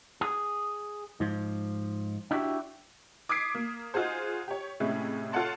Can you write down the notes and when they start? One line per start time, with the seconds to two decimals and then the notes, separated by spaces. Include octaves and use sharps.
0.21 G#4
1.20 G#2 F3
2.31 D4 E4 F#4 G4
3.29 D6 D#6 G#6 B6 C7 D7
3.54 A#3
3.94 D#4 F4 F#4 G#4 C5
4.48 G4 C#5
4.80 A2 C3 G#3 C#4 E4 G#4
5.32 F4 A4 C#5 F#5 A5 C6